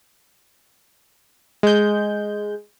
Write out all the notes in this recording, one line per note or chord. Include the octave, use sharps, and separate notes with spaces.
G#3 G6